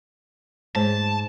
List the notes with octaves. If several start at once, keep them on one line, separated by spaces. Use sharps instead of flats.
G#2 A5